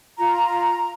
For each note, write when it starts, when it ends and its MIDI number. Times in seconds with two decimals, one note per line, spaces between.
0.18 0.93 65
0.18 0.93 82